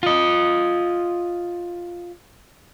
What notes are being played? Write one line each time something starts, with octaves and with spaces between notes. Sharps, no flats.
F4 D#5